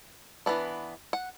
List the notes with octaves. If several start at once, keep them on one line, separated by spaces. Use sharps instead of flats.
E3 B3 D4
F#5